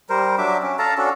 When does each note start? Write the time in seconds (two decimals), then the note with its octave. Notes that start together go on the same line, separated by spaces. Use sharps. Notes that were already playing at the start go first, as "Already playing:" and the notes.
0.10 G3 A#4 C5
0.38 F#3 D4 E5 D6
0.63 C#4
0.79 A4 F5 A5 A#5
0.98 C#4 D4 F#4 A4